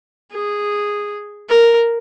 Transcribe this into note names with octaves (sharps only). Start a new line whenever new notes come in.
G#4
A#4